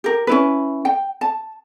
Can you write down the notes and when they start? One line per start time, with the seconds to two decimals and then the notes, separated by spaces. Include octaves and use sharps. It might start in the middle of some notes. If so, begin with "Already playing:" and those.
0.04 G4 A#4
0.27 C#4 E4 B4
0.85 G5
1.21 A5